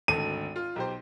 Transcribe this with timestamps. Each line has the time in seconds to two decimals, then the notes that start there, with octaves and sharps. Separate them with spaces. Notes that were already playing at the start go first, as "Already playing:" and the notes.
0.08 G#1 D2 A4 D#7
0.56 F4
0.76 B1 G4 C5